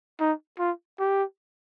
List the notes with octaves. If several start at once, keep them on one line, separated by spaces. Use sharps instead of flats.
D#4
F4
G4